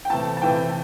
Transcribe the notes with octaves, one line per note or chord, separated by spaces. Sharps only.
G5
C3 E3 A3 A5
A5
C3 E3 A3 G5